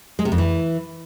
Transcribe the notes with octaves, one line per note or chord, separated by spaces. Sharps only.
G#3
C3
F2
E3